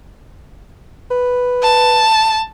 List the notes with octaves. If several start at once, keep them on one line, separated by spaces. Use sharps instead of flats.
B4
A5